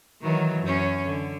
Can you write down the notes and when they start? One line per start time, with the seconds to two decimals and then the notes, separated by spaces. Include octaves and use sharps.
0.22 D#3 E3 F#3
0.62 F#2 C#4
1.04 D3